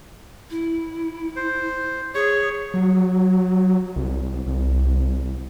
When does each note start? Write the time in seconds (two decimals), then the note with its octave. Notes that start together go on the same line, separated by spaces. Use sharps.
0.51 E4
1.36 C5
2.15 G#4 C#5
2.74 F#3
3.96 C2
4.47 C2